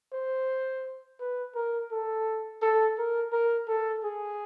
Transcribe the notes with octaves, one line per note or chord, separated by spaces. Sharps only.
C5
B4
A#4
A4
A4
A#4
A#4
A4
G#4